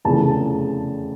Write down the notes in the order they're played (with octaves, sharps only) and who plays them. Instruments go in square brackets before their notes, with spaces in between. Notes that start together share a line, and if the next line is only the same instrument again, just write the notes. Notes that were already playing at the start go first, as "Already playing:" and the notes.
[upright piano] F1 E2 C#3 A5